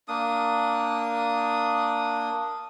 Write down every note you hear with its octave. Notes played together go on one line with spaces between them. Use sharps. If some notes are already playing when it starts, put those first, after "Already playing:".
A#3 D4 D#6